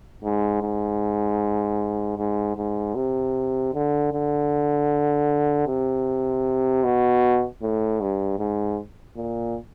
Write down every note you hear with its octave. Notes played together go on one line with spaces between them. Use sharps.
G#2
G#2
G#2
G#2
C3
D3
D3
C3
B2
A2
G2
G#2
A#2